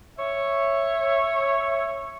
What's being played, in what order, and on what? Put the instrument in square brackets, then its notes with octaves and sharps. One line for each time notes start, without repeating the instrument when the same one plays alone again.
[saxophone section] C#5 E5